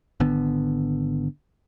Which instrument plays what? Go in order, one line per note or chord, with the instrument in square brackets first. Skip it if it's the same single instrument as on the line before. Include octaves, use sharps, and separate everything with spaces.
[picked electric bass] G#1 D3 B3